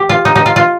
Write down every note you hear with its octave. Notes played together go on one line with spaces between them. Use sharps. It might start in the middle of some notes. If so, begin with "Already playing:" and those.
Already playing: G4
F4
D#4
D#4
F4
F4